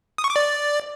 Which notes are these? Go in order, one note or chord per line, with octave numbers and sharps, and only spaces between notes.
D#6
C#6
D6
D5